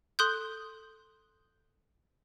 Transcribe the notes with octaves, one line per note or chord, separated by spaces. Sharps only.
A4 C6 D#6 F#6 G6